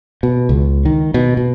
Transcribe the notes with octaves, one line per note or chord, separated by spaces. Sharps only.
B2
C#2
D#3
B2
B2